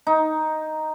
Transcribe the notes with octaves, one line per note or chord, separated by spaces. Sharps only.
D#4